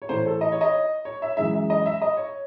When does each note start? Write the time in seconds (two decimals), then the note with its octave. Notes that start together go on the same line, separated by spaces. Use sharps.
0.02 C#5
0.09 A2 E3 A3 C5
0.26 A4
0.41 D#5
0.52 C#5
0.61 D#5
1.05 C#5
1.22 E5
1.37 F#2 E3 G#3 E5
1.54 E5
1.70 D#5
1.86 E5
2.02 D#5
2.17 C#5